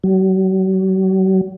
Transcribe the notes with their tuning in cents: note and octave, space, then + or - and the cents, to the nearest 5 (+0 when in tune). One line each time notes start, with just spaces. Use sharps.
F#3 +40